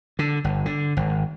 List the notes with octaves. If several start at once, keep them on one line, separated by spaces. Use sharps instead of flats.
D3
G1
D3
G#1